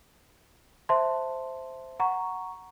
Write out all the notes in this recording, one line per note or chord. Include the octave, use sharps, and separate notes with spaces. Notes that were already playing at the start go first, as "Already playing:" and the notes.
C5 E5 A5 C6
F#5 A#5 C#6